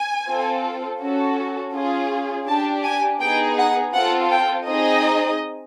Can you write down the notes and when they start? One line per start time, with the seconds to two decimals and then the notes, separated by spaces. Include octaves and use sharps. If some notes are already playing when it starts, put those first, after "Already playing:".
Already playing: G#5
0.28 C4 F4 A4
1.01 C#4 F#4 A4
1.74 C#4 F4 G#4
2.47 D4 G4 A5
2.84 G#5
3.21 B3 D#4 G#4 G5
3.58 F#5
3.94 C4 F4 A4 F#5
4.31 G5
4.67 C4 D#4 G#4 D#5